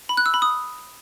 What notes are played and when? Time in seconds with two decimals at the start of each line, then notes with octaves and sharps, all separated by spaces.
0.09 B5
0.17 F#6
0.26 E6
0.34 B5
0.42 D#6